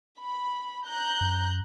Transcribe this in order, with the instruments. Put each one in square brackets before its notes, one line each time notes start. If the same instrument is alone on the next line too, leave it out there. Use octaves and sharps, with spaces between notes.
[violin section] B5
A#5 F#6 G6
[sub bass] F#2